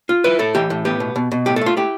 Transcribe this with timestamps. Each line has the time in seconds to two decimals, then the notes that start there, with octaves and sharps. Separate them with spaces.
0.09 F4
0.24 E4 B4
0.39 A2 A4
0.55 E3 G4
0.70 A2
0.85 B3 G4
1.00 B2
1.16 B2
1.32 B2
1.46 A2 G4
1.56 A4
1.61 A3 F4
1.77 E4 G4